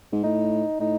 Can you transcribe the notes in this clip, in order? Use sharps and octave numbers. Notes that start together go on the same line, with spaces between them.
G#2
A2 D#4
A2 D#4